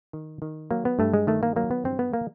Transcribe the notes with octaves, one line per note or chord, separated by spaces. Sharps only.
D#3
D#3
F#3 A#3
B3
G2 A3
G#3
D#3 A3
A#3
F#3 A#3
B3
G2 C4
B3
A#3